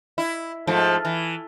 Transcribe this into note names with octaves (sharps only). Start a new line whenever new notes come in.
E4
G#2 F3 A3
E3